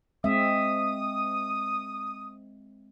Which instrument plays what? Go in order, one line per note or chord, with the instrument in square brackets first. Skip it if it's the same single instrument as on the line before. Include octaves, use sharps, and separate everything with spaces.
[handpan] G#3 C4 E5 [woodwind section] D#6